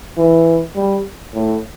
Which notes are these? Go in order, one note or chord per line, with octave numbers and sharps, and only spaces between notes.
E3
G3
A2